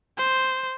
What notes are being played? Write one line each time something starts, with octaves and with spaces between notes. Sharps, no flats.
C5